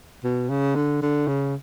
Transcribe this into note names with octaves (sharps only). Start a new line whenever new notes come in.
B2
C#3
D3
D3
C#3